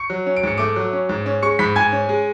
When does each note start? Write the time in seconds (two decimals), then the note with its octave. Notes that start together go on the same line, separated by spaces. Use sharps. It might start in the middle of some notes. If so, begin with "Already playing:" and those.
Already playing: C#6 C#7
0.10 F#3
0.26 C#4
0.36 D7
0.43 G#2 C#7
0.58 A3 D6 D7
0.76 F#3
0.93 C#4
1.09 G#2
1.26 C#4
1.43 G#3 C#6 C#7
1.59 G#2 B5 B6
1.76 G#2 G#5 G#6
1.92 C#4
2.09 G#3